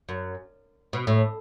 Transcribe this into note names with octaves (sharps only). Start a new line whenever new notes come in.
F#2
B2
A2